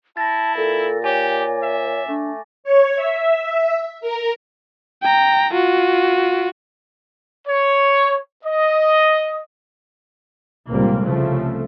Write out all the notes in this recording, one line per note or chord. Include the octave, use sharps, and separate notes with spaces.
E4 A5 A6 A#6
A#2 A4
G4 C#5 G#5 D6
E5
A3 D4
C#5
E5
E5
A#4
G5 A#5
F4 F#4
C#5
D#5
F1 C#2 A#2 G3 A#3 C4
C2 C#3 F3 A3